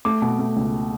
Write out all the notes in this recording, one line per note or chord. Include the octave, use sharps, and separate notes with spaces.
A3 D6
B2
A3
C#2